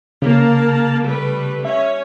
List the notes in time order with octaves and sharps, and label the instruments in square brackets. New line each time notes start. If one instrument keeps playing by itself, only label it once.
[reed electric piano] C#3 [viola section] A#3 A5
[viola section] G3 A3 B4
[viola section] C#4 C#5 [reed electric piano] E5